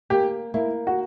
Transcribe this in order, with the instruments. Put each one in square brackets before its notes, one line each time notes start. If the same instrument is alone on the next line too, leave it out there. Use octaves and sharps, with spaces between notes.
[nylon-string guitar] A#3 [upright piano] G4
[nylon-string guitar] A#3 [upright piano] E4
[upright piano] F#4